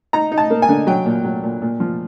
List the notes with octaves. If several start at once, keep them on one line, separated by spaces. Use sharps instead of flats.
D#4 A#5
D#4
A5
A#3
G#5
D3
F#3 G5
A#2
F#3
A#2
A#2
F3